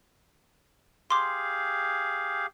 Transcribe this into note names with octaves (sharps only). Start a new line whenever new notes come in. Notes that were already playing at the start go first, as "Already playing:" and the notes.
G4 G#4 F5 C6 D6